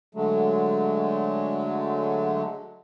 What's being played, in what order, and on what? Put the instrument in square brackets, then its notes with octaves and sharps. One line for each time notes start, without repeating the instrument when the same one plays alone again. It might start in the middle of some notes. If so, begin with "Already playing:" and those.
[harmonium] D3 F#3 G#3 A3